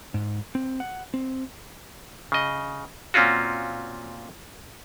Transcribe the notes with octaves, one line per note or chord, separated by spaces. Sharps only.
G#2
C4
F#5
C4
C#3 D#5
A#2 C4 C#4 F4 F#4